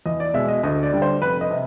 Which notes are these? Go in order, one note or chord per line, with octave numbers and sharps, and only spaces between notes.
E2 D#5
D5
B2 G#3 E5
D#5
D2 D#5
D5
D3 G3
C5
F1 B4
D#5
C3